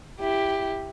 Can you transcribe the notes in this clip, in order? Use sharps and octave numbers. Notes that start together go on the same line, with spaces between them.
E4 G4